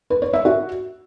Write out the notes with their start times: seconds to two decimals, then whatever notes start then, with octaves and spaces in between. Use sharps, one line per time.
0.10 B4
0.22 C#5
0.33 E5
0.45 F#4